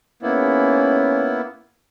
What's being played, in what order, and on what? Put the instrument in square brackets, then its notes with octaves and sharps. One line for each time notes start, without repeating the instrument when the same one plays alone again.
[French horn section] G#2 C#4 [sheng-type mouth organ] A#3 B3 E4